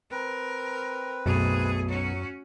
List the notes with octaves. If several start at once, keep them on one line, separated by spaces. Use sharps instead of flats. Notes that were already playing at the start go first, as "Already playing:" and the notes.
C4 A#4 B4
B1 F#2 B2 A3 G#4
F#3 C#4 F#4